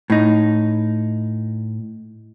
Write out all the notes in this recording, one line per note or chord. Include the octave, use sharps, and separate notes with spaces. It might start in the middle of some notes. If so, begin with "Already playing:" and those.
A2 D#4